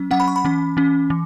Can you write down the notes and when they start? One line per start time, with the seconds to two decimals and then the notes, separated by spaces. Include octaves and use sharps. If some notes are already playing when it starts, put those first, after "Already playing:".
Already playing: F#3 C#4
0.11 F#3 C#4 F#5
0.20 B5
0.28 C#6
0.36 B5
0.45 E3 C#4
0.77 E3 C#4
1.10 E3